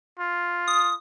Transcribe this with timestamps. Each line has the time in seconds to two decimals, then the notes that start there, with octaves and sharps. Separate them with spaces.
0.19 F4
0.68 D#6